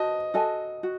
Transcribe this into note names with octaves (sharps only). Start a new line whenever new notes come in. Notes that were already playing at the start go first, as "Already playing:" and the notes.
Already playing: F#4 C5 D#5 A5
F#4 A4 D#5 G#5
F#4